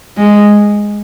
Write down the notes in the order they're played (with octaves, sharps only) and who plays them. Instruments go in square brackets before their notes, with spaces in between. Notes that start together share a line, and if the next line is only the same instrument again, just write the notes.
[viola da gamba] G#3